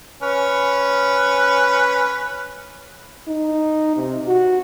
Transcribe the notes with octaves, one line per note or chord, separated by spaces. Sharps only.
C#4 B4
D#4
C3
F#4